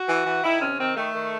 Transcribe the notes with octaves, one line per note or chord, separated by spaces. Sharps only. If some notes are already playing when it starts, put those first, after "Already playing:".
Already playing: F#4
E3
E3
D#3 E4
C3 C#4
D#3 C4
D#3 A3
D#3